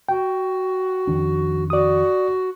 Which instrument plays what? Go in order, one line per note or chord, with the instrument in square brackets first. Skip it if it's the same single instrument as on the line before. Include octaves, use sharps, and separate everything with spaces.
[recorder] F#4 [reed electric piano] G5
[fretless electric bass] F2 D#3 D4
[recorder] F#4 [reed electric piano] D5 D#6